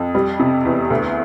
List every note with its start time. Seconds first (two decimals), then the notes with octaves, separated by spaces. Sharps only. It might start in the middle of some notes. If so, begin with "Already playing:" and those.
Already playing: F2
0.15 G3
0.40 C3
0.65 E2
0.90 D2